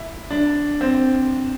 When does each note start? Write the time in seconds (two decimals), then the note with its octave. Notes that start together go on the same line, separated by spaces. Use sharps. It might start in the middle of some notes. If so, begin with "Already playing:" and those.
Already playing: E4
0.31 D4
0.81 C4